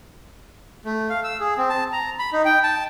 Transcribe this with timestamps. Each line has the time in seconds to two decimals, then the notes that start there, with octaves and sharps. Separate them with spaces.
0.85 A3
1.10 F5
1.24 E6
1.40 G#4
1.57 C4
1.70 A5
1.92 A#5
2.19 B5
2.33 D#4
2.45 G5
2.64 A5